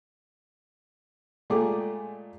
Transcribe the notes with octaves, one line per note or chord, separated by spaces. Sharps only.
A#2 G#3 A3 G#4 G5 D6